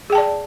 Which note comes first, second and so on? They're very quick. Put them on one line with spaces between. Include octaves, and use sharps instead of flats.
G#4 G5 A5 D5